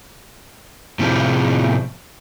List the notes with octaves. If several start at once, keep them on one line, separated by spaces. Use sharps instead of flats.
A2 C3 F3